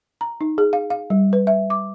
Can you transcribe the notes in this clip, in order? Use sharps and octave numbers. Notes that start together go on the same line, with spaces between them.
A#5
D#4
G#4
F5
F5
G3
B4
E5
D6